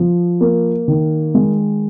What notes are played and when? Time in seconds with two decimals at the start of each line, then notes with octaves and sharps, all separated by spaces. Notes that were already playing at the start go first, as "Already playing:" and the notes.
Already playing: F3
0.41 A#3
0.88 D#3
1.35 G#3